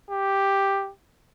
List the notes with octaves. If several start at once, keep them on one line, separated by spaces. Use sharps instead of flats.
G4